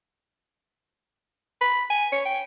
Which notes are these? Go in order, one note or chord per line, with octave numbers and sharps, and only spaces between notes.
B5
G#5
C#5
G5